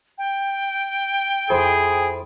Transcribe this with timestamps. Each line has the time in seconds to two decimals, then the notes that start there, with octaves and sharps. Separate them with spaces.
0.18 G5
1.50 F2 C4 E4 G#4